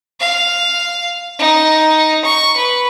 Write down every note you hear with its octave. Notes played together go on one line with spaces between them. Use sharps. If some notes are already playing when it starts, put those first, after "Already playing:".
F5
D#4
C#6
B4